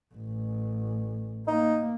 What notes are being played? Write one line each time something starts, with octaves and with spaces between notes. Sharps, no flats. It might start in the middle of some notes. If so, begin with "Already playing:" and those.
A1
A#3 D#4